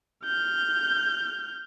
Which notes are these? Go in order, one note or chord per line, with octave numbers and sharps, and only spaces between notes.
F6 G6